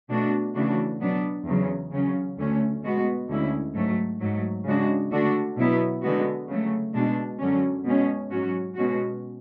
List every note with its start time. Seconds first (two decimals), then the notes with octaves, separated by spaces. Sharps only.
0.09 B2 A3 D4 F#4
0.55 C#3 E3 A3 D4 F#4
1.01 B2 F#3 B3 D4
1.46 E2 C#3 F#3
1.92 C#3 F#3 C#4
2.37 D2 D3 A3 C#4
2.83 B2 G#3 B3 F#4
3.29 D2 D3 G#3 C#4 E4
3.75 G#2 F#3 A3
4.21 G#2 F#3 A3
4.65 C#3 G#3 D4 F#4
5.11 D3 A3 D4 F#4
5.57 B2 F#3 B3 E4
6.02 D3 G#3 B3 F#4
6.48 C#3 F#3 A3
6.94 B2 G#3 D4
7.39 F#2 D3 F#3 C#4
7.85 B2 G#3 C#4
8.31 G#2 F#3 C#4 F#4
8.76 B2 G#3 C#4 F#4